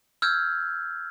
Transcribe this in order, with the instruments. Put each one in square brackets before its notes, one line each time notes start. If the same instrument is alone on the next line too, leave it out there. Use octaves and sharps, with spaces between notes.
[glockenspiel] E6 F6 G6 G#6